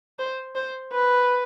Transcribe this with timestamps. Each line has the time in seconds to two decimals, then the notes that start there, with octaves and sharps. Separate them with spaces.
0.19 C5
0.55 C5
0.92 B4